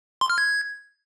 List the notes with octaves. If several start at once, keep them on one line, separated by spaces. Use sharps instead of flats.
C6
F6
G#6